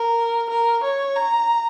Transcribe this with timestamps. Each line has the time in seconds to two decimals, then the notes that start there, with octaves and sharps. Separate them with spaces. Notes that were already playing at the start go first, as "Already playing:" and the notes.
Already playing: A#4
0.49 A#4
0.83 C#5
1.16 A#5